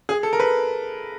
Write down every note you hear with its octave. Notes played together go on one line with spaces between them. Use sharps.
G#4
A4
A#4
B4